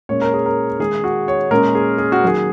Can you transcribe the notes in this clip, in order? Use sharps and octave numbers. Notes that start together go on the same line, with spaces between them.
A#2 G#3 C#4 C#5
A#4
G#4
A#4
D#3 G#3 D#4 G#4
F#4
C#5
A#2 G#3 C#4 A#4
G#4
G#4
F#4
D#3 F#3 A#3 G#4